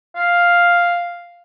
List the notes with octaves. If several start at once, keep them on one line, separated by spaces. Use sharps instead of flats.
F5